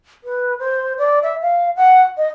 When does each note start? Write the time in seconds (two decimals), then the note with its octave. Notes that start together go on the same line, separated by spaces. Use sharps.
0.24 B4
0.59 C5
0.98 D5
1.23 E5
1.42 F5
1.76 F#5
2.17 D#5